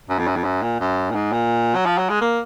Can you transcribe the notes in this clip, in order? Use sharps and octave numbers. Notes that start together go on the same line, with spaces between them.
F#2
F2
F#2
F2
F#2
A#2
F#2
A#2
G#2
A#2
F#3
F3
F#3
G#3
A#3